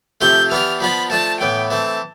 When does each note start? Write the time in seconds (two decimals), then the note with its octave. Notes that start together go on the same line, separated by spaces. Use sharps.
0.21 C3 F3 A3 C4 G4 G6
0.51 E3 B3 D4 G4 F6
0.80 F3 B3 D4 F4 B5
1.10 F3 A3 D4 A5
1.40 A2 E3 B3 G5
1.70 E3 A3 C4 A5